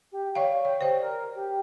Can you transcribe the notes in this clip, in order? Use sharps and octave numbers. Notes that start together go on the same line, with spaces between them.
G4
C#5 D5 F5 C#6
C#5 G5
G4 C5 D5
A#4
G4